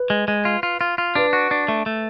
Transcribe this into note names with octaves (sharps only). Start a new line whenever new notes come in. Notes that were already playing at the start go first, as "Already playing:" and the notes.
Already playing: B4
G#3
G#3
F4
F4
F4
F4
D4 B4
F#4
D4
A3
A3